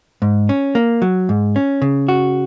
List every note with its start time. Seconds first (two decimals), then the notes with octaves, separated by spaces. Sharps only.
0.22 G#2
0.49 C#4
0.75 A#3
1.02 F#3
1.29 G#2
1.56 C#4
1.82 C#3
2.08 F#4